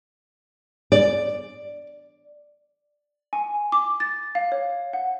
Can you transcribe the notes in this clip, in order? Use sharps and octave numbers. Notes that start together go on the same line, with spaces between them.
D5
G#5
D6
A6
F5
C#5
F#5